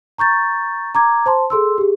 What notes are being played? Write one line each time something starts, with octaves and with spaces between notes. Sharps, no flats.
A#5 C#6 G6 A6
A#5 D6 G#6
C5 A5 C6
G#4 A4 C6 E6
G4 G#4